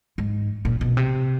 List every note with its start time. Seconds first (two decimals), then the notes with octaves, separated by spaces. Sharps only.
0.18 G#2
0.65 A#2
0.81 B2
0.97 C3